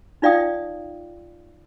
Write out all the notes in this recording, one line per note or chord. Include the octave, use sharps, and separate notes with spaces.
D#4 F4 D5 F5 G5 D#6